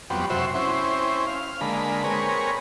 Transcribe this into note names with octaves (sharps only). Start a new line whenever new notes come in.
F2 F#3 G3 B3 C4
F#2 C3 F#4 C5 E5
C4 C#4 E4 C5
F5
D3 G#3 A#3 B5
C4 G#4 A#4 B4 C#5